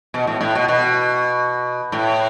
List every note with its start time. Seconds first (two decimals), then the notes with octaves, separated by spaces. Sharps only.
0.14 B2
0.27 A2
0.41 A2
0.55 B2
0.68 B2
1.92 A2